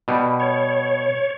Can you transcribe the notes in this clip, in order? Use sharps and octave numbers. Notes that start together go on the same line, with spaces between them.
B2 G3
C#5